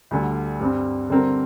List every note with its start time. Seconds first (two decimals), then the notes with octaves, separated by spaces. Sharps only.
0.11 D2 D3 G3
0.60 G2 G3 C4
1.10 D3 G3 C4 A#4